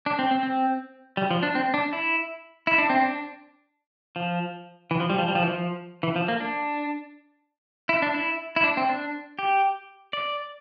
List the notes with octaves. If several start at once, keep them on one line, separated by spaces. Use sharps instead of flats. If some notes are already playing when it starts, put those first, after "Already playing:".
D4
C4
C4
C4
G3
F3
D4
C4
D4
E4
E4
D4
C4
D4
F3
E3
F3
G3
F3
G3
F3
E3
F3
E3
F3
A#3
D4
E4
D4
E4
E4
D4
C4
D4
G4
D5